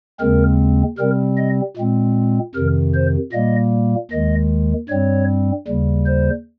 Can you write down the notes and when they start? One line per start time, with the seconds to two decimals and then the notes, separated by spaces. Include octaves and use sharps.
0.20 D#2 C#3 G#3 C4 A#4
0.98 C3 G3 C4 A#4
1.38 D#5
1.77 A#2 G#3 C4
2.55 F2 C3 D#3 A#4
2.94 C5
3.33 A#2 G3 A#3 D#5
4.11 D#2 D#3 G#3 D#5
4.89 G2 G3 C4 C#5
5.68 D#2 C#3 G3
6.06 C5